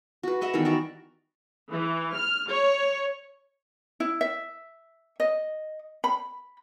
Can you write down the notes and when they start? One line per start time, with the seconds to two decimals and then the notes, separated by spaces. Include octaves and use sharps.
0.23 F#4 B4
0.41 B4 D#5 E5 F#5
0.53 D#3 E3 G3 B3
0.65 D#4 F#4 D5 E5
1.73 E3
2.16 F6
2.52 C#5
4.00 E4
4.21 E5
5.20 D#5
6.04 B5